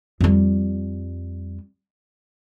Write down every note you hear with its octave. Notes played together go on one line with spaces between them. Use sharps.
F2 G3